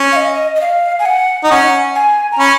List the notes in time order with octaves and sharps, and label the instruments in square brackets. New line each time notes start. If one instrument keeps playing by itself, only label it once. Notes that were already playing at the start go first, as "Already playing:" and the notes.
Already playing: [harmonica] C#4
[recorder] F5
D#5
D#5
F5
G#5
F#5
[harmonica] D#4
[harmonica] C#4 [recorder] F#5
[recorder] G#5
A#5
[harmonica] C#4 [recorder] B5